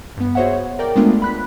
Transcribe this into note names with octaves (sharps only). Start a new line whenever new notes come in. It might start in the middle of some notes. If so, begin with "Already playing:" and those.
G2 B3
F#4 G#4 C5 C#5 E5 F#5
C#5
A#4 D5 G5
G#3 A3 B3 D4 F4
B5 F#6 B6